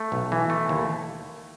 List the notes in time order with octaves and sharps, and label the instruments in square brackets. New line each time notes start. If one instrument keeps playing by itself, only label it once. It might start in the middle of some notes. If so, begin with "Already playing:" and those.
Already playing: [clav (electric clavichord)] A3
B1
E3
A3
D#2